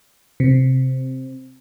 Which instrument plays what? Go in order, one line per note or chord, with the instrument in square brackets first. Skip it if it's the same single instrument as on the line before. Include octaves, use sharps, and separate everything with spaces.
[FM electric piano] C3